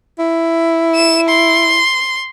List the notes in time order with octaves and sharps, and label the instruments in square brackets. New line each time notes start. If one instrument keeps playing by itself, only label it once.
[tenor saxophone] E4
[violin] E7
C6